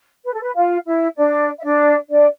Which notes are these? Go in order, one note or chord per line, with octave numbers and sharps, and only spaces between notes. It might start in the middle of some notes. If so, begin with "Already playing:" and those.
B4
A4
B4
F4 F5
E4 E5
D4 D5
E5
D4 D5
D4 D5